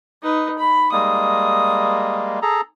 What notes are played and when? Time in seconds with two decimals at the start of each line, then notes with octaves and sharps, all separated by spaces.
0.22 D#4 B4
0.58 B5
0.92 G3 G#3 A#3 D#6
2.42 G#4 A4 A#5